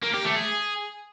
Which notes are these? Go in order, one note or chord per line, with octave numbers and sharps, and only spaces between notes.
A#3
G4
A3
G#4